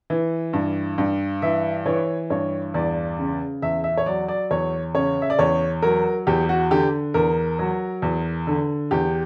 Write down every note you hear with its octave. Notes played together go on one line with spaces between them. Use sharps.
E3
G2
G2
E3 E5
E3 C#5
G2 C#5
E2 D5
C#3
E2 E5
E5
C#5
F#3 D5
D5
E2 C#5
C#3 C#5
E5
D5
E2 C#5
F#3 A#4
E2 G4
F#4
D3 G4
E2 A#4
F#3
E2
D3
E2 G4